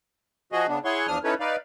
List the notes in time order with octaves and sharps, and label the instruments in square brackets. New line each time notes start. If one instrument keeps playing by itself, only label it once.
[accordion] F3 F#4 G#4 D#5
C#3 B3 D4
E4 G#4 C#5 F#5 C6 C#6
E2 F3 D4 D#6 F6
C#4 D#4 E4 A4 B4 C#5
D#4 B4 D5 F5